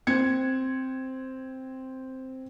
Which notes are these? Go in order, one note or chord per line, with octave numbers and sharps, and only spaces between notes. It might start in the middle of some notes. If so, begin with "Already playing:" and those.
C4 G#6 C#7